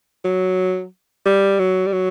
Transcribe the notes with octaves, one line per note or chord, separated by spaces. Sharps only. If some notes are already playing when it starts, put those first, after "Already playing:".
F#3
G3
F#3
G3
F#3